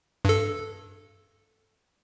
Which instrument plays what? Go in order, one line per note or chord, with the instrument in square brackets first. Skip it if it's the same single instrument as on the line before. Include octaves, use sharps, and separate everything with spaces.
[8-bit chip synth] G2 A4